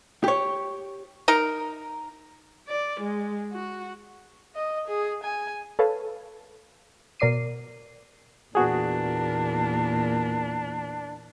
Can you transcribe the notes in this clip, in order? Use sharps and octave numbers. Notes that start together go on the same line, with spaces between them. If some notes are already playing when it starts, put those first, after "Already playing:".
G4 C#5
D#4 A#4
D5
G#3
F#4
D#5
G#4
G#5
A4 B4 C#5 F5 A5
B2 A#4 D5 D6 C7 D#7
E2 A#2 A#3 B3 D4 F#4 G#4